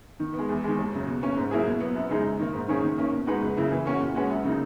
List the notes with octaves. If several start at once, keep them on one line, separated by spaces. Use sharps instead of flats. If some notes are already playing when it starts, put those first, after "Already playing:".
D#3
B3
G#3
E2
D#3 G#3
D#2
C#3 F#3
B2
A#3 C#4
G#2
F#3 A#3 E4 G#4
B2
F#3 B3
F#2
C#3 G#3 D#4 G#4
F#2
D#3 A#3
G#2
D#3 A#3 C#4 G#4
D#3
A#3 C#4
B2
G#3 D#4 F#4 B4
C#2
C#3 F#3 A#3 E4
E3
A#3 C#4 F#4
A#2
G#3 C#4 F#4 B4
F#2
C#3 F#3 A#3 D#4